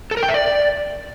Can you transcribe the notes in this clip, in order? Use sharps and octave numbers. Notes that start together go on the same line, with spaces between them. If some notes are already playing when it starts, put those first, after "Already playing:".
A4
A#4
G5
E5
D5